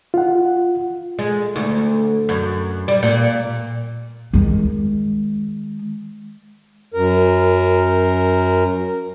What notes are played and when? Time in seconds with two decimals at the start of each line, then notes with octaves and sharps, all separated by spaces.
0.14 F4 F#5
1.19 G#3
1.56 D2
2.29 F#2
2.88 G3
3.03 A#2
4.33 D#3 G#3
6.94 F#2 A#4